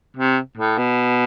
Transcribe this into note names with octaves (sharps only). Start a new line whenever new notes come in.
C3
A2
B2